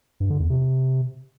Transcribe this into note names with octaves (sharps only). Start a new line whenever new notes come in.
G2
D3
E2
C3